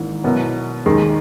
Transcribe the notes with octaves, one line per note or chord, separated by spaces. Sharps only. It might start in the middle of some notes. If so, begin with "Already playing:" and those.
Already playing: G#1 G#2 E3 A#3 E4
B2 F#3 B3 E4 A#4
D#2 D#3 G#3